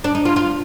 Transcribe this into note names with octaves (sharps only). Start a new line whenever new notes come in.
D4
D#4
F4
F4